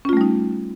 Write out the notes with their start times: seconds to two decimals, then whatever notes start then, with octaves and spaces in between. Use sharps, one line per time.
0.05 C#4
0.09 F4
0.13 A3
0.17 G3
0.21 D#4